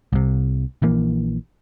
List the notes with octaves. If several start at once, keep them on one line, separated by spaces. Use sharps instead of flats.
C2 C3
A#1 E3 A#3